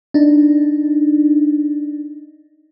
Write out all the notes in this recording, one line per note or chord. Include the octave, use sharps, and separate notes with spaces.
D4 D#4